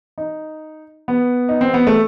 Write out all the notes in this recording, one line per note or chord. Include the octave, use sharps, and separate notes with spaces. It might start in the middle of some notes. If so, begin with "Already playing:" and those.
D#4
B3
D#4
C4
B3
A3